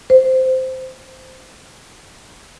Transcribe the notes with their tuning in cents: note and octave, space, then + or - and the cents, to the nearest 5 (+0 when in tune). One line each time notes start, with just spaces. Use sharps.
C5 -10